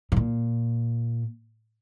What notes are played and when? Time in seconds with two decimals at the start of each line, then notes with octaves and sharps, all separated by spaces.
0.12 A2
0.17 A#2